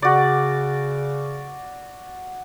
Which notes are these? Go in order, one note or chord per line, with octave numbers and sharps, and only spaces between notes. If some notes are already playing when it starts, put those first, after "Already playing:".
C#3 F#4 D5